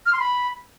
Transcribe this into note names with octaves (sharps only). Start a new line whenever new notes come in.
F6
C6
B5